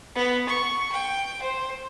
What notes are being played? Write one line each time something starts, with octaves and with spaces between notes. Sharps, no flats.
B3
C#6
G5
C5